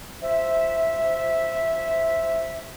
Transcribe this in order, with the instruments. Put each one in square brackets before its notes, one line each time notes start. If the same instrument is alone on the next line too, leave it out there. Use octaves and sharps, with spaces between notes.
[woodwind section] F3 C5 E5